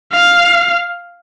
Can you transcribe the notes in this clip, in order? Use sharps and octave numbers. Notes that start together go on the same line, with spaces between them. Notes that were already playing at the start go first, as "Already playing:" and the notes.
F5